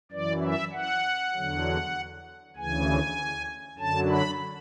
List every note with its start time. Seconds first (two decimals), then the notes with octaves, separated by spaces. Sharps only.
0.12 F#2 E3 D5
0.42 E5
0.73 F#5
1.34 E2 D3 F#3
2.56 D2 C#3 E3 G#5
3.78 F#2 D3 F#3 A5
4.09 B5